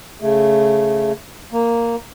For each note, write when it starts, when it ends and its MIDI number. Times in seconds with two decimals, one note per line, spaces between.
0.22 1.12 49
0.22 1.12 57
1.52 1.96 58